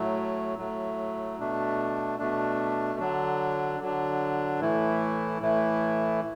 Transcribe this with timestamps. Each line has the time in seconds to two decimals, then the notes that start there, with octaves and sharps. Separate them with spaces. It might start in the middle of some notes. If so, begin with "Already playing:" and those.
Already playing: A2 F#3 A3
0.58 A2 F#3 A3
1.39 B2 A3 D4
2.19 B2 A3 D4
2.99 D3 F#3 D4
3.80 D3 F#3 D4
4.59 A2 E3 A3 E4
5.41 A2 E3 A3 E4